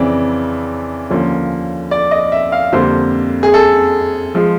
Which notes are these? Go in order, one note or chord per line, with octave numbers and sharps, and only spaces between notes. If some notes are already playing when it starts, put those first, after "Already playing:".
Already playing: F2 C#3 E3 C4 D5
D#2 D3 F3 A#3 C#4
D5
D#5
E5
F5
F2 D3 G3 A#3 C5
G#4
A4
F3 G#3